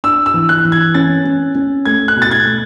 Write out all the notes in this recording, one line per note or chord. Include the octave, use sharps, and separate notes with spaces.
D4 E6
E6
E3
F#6
E3
G#6
C#4 A6
C#4
C#4
A3 G#6
F#6
B2
A6
G#6
A3